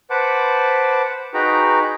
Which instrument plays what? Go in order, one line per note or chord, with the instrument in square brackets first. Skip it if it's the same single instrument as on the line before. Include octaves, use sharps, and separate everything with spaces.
[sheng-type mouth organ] B4 C5 F#5 A5 D6
D#4 F#4 G#4 B4 G5 A#5